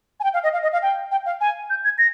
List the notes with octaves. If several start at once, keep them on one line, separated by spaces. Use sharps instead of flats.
G#5
G5
F5
D#5
F5
D#5
F5
G5
G5
F5
G#5
G6
G#6
A#6